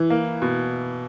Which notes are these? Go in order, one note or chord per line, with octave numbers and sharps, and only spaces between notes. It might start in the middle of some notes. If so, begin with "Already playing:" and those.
Already playing: E3
A#3
B2